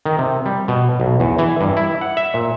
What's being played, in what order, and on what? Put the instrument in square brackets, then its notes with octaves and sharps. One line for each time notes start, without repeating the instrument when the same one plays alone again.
[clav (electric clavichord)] D#3
C3
G3
B2
B1
E2
E3
G2
E4
F#5
E5
A#2